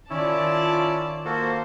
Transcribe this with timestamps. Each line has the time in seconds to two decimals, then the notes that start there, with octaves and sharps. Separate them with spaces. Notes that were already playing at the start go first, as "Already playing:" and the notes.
0.10 D#3 C#4 E4 F4 D5 A5
1.25 A#3 F#4 A4 C5